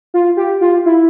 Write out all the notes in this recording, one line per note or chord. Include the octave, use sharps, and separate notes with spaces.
F4
G4
F4
E4